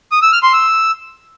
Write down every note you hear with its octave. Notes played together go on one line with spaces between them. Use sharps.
D#6
E6
F6
C6
E6